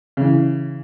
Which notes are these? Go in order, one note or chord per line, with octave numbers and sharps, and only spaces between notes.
C#3 E3